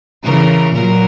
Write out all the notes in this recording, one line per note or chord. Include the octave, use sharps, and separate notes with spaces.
C#3 E3 A#4
A#2 F#3 A#4